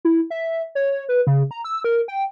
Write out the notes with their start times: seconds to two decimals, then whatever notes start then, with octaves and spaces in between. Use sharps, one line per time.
0.05 E4
0.30 E5
0.75 C#5
1.09 B4
1.27 C#3
1.51 A#5
1.65 E6
1.84 A#4
2.08 G5